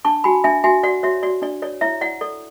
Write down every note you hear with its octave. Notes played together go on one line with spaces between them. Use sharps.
D4 A5 C#6
F#4 G#5 B5
D4 E5 G#5
F#4 E5 G#5
F#4 D5 F#5
F#4 C#5 E5
F#4 D5
D4 D5
C#5 D5
E4 C#5 E5
E4 D5 F#5
A4 D5